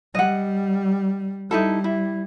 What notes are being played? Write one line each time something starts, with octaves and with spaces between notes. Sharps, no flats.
G3 D#5 F#5
G3 D#4 E4 A4
E4